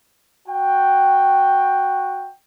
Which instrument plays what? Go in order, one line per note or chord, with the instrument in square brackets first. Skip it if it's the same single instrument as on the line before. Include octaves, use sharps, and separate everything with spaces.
[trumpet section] F#4 G5